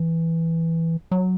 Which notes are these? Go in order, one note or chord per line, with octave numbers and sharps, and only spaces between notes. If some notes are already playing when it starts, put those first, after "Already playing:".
Already playing: E3
F#3